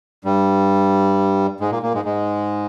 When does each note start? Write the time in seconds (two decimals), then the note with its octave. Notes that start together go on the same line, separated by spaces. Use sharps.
0.25 G2 G3
1.60 G#2 G#3
1.71 A#2 A#3
1.83 A#2 A#3
1.94 G#2 G#3
2.05 G#2 G#3